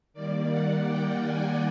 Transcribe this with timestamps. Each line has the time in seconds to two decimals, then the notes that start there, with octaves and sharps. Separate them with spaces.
0.13 D#3 G3 A#3 D5
0.50 F#5
0.86 G5
1.23 G#5